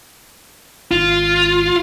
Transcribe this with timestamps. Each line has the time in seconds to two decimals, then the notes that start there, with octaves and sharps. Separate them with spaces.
0.91 G#1 F4